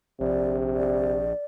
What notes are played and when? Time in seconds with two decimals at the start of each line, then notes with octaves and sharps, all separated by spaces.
0.21 A#1 C3 D5
0.76 D5